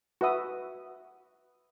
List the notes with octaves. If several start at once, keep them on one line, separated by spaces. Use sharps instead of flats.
F#4 B4 E5 D#6